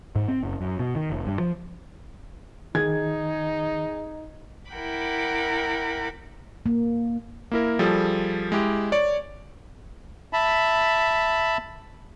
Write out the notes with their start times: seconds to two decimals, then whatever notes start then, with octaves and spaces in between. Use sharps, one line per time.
0.16 G#2
0.28 C4
0.43 F#1
0.61 F#2
0.79 B2
0.96 D#3
1.10 F1
1.27 G2
1.40 F3
2.75 D#3 D#4 G#4 G#6
4.71 E4 A#4 F#5 G5 B5 D6
6.66 A#3
7.51 A#3 E4 A#4
7.79 F3 G3 G#4 A4
8.52 G#3 E4 G4
8.92 C#5 D5 C#6
10.33 E5 A5 B5